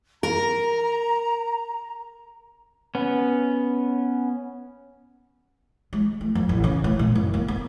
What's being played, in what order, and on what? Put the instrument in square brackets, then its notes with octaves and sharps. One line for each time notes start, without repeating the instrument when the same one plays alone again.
[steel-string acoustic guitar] A#4 [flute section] A#5
[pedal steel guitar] B3 C#4
[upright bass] G#3
A3
F2
A1
C#3
A2
A#2
F#1
A#3
B3